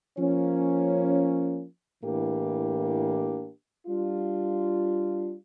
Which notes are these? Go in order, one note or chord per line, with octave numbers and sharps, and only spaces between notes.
F3 A#3 C#4
A2 E3 A#3 D4 G4
G3 D4 F4